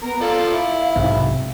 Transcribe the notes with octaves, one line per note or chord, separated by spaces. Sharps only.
B3 A#4
F3 A4 D5 F5
E4
B1 G#2 C3